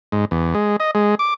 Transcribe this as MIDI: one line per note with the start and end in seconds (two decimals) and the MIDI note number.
0.12 0.25 44
0.31 0.54 40
0.55 0.76 56
0.80 0.91 75
0.95 1.15 56
1.19 1.34 86